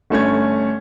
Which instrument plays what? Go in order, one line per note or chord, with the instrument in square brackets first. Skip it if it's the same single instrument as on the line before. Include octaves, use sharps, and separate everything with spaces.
[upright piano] G1 A3 C#4 G#6